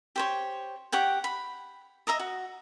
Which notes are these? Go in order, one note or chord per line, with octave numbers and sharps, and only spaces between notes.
G4 C5 C#5
G4 C#5 F#5 G5
B5
D#5 E5 A#5 D#6
F#4